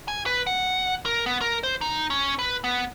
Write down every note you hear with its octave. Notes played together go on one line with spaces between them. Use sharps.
G#5
B4
F#5
A#4
B3
A#4
C5
D#4
C#4
B4
B3